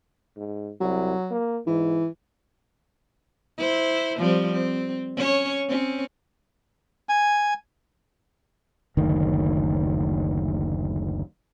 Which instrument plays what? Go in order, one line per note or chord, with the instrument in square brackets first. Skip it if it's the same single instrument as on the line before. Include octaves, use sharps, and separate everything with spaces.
[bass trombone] G#2
[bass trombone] C2 [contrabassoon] F#3
[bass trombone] A#3
[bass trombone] G#2 [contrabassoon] E3
[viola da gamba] E4 C5
F3 G3 C4
C4
C#4 C#5
C4 C#4
[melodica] G#5
[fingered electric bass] F#1 D2 D#3